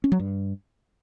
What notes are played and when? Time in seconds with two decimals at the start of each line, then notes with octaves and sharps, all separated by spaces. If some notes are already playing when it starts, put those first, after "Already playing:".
0.04 C#4
0.12 F#3
0.19 G2